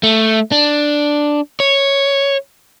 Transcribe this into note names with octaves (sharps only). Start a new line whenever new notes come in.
A3
D4
C#5